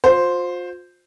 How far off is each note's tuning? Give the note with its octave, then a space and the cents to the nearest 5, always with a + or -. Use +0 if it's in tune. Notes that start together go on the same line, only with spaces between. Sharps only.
F4 +35 C5 +0